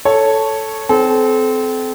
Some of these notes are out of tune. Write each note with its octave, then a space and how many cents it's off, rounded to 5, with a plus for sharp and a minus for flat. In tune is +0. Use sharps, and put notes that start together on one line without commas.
A4 +0 C#5 +0
C4 -20 A4 -35